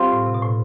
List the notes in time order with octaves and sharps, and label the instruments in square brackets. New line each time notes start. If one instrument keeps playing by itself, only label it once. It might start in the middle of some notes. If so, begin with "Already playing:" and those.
Already playing: [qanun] G3 C4 F4
[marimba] A2
C3
B2
A2